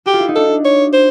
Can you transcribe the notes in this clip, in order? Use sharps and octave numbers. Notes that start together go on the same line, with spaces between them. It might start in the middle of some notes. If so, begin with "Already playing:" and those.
F#4 G4
F4
E4
D#4
D4 A4
C#5
C5